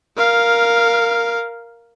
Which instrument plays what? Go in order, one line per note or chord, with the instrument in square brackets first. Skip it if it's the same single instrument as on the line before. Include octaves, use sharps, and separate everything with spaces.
[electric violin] A#4 F5